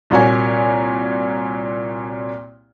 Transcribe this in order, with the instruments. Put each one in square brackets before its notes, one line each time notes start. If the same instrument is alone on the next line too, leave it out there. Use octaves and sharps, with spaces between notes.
[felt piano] C2 A#2 A#3 F#4 C#5 G#5